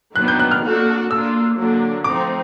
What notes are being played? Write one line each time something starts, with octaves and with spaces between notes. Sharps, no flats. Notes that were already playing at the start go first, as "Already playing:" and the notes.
D#3 F#3 B3 D4 F#6
G6
F#6
F6
A#3 D4 F#4 A4
A#3 D4 F4 E6
D3 F#3 A#3 D4
F3 A3 C4 D#4 D6